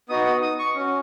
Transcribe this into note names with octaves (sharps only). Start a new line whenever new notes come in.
B3 D#4 F#4 D#6
D#6
D#6
C#6
C#4 F#4